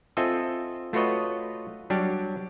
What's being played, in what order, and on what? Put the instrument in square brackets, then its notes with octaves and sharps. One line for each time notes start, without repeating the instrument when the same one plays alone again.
[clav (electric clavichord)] C4 F4 A4 D#5 E5 G#5
A3 F4 F#4 B4 C#5 D#5
F#3 G3 D4 G4